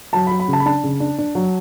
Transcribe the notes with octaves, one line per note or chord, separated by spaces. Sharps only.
F#3 A5
B5
F#3
B5
C#3 A5
B5
D4 A5
C#3
D4
D4
F#3